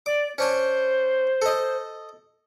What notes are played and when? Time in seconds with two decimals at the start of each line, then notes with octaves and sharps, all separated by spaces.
0.06 D5 D6
0.38 C#4 D4 C5 G#5
1.42 A4 D#5